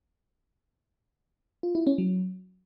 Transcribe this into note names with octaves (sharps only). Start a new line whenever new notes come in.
F4
E4
C#4
F#3